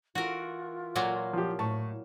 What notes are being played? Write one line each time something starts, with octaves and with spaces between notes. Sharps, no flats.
E3 F4 F#4 A#4
A#2 F#3 A#3
F3 G4
A2 A5 C#6